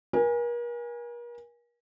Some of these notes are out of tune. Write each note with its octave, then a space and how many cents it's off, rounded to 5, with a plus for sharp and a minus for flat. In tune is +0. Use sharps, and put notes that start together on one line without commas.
A#4 +40 G#5 -15